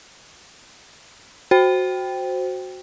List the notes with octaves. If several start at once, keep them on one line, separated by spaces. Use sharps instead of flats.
F#4 C5 G5